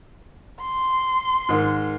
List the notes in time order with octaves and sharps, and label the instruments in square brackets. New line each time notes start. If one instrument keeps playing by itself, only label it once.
[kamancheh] C6
[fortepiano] G#2 D#3